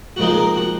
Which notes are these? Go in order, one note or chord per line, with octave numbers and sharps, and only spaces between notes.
A#2 F3 G#3 C4 D#4 F#4
G#4
A#4
F#4